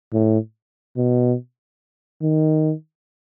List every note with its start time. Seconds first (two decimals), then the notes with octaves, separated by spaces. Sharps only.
0.13 A2
0.97 B2
2.22 D#3